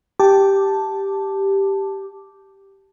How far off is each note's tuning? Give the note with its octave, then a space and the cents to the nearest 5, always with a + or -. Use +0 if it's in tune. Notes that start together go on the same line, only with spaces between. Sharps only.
G4 +0 A5 +0 D6 +0